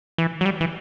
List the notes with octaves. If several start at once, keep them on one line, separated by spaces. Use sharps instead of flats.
E3
F#3
G3
E3